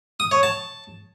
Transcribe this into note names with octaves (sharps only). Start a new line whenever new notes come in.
D#6
C#5
A5